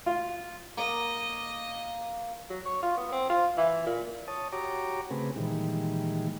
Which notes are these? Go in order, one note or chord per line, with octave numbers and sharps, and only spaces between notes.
F4
A#3 D#5
F#3
C#5
F4
B3
C4
F4
E3
A#2
C#5 A5 D#6
F#4 G4 C#5 A#5 D6
C#3 A3 C4 G#4 B4
A#2 D#3 E3 G3 G#3